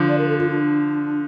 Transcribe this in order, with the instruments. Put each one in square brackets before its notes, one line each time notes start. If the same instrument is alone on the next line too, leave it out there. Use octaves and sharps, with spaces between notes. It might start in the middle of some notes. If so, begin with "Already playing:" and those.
Already playing: [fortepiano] D3 F3
[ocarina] D5
A#4
A4
F4
D4